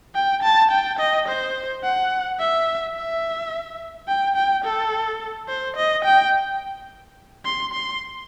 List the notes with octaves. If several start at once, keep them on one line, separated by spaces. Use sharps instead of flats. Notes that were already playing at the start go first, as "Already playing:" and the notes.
G5
A5
G5
D#5
C5
F#5
E5
E5
G5
G5
A4
C5
D#5
G5
C6
C6